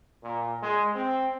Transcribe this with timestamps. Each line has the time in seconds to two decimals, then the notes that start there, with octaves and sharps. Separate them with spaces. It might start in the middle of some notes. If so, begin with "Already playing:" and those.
0.23 A#2
0.62 G#3
0.95 C4